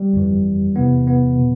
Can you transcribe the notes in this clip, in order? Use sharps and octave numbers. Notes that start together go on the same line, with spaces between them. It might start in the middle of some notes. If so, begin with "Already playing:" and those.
Already playing: G3
G1 F2 E3
E2 C3 E3 B3
B3
B2